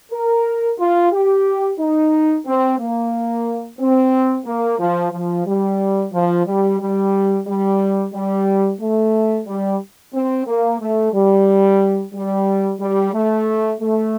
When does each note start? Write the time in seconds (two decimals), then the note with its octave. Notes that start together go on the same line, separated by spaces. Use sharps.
0.12 A#4
0.79 F4
1.12 G4
1.79 D#4
2.45 C4
2.79 A#3
3.79 C4
4.46 A#3
4.79 F3
5.12 F3
5.46 G3
6.12 F3
6.46 G3
6.79 G3
7.46 G3
8.12 G3
8.80 A3
9.46 G3
10.13 C4
10.46 A#3
10.80 A3
11.13 G3
12.13 G3
12.80 G3
13.13 A3
13.80 A3